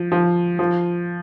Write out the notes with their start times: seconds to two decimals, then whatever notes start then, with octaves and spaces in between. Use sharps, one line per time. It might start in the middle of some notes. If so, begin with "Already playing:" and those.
Already playing: F3
0.12 F3
0.59 F3